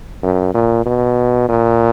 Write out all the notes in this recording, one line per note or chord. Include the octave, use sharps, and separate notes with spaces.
F#2
A#2
B2
A#2